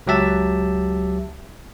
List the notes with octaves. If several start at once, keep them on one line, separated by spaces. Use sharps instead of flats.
C#2 F#3 G4 E5 A5